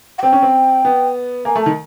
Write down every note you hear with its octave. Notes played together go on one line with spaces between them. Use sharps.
F#5
C4 G5
C#4
C4
B3
A#3 G#5
A3
A5
D#3